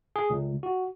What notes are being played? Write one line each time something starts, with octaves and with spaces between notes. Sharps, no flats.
G#4
C#2
F#4